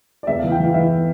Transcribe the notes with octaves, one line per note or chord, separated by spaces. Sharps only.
D5
E2 E5
E3 F5
G5
E3 F5
E3 E5